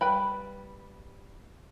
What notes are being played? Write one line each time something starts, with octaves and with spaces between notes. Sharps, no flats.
G3 B4 G5 B5